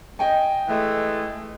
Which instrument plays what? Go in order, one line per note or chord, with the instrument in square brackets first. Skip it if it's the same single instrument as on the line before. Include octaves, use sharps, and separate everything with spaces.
[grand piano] D#5 G5 G#5
[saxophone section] E3 G#3 A3